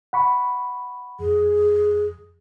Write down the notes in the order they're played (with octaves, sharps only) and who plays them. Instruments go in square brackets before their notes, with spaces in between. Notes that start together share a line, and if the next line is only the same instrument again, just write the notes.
[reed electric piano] F#5 B5 C#6
[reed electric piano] F2 [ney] G#4